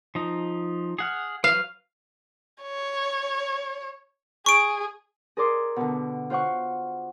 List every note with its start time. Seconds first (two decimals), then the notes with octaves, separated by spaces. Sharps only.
0.15 F3 D#4
0.99 G#4 F#5 F6
1.44 F#3 B4 F5
2.63 C#5
4.46 G#4 C#6 D7
5.37 G#4 A#4 D5 C6 D6
5.76 B2 D3
6.30 F4 C5 F#5 C#6